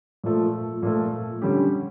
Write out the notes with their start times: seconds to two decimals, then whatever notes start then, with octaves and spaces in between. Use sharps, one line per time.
0.24 A#2 F3 A3
0.83 A#2 F3 A3
1.42 D3 G3 C#4 G4